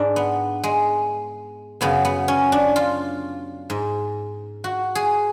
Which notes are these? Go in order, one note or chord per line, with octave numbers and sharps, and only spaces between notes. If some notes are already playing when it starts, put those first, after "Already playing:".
Already playing: G#2 D4
B3
G#3
F#2 C#3 B3
B3
C#4
D4
F4
G#2
F#4
G#4